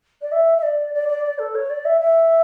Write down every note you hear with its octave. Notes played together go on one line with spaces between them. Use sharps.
D5
E5
E5
D5
D5
D5
D5
A4
C#5
D5
E5
E5